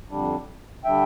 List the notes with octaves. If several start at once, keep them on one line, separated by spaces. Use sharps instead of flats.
F2 D3 G3 D4
D3 G3 D4 E5 G5